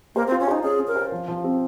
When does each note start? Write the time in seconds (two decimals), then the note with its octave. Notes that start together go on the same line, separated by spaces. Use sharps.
0.15 A#3 C5
0.27 C4
0.32 F4
0.40 C#4
0.47 D#4 C5
0.63 C#4 G#4
0.79 C#4
0.87 A#4
0.96 C5
1.12 F3
1.28 F3
1.44 C4